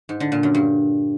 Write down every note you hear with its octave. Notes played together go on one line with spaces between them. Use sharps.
G#2
D3
A#2
F#2
G2